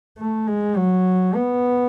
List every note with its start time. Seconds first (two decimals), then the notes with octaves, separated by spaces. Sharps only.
0.18 A3
0.47 G#3
0.77 F#3
1.35 B3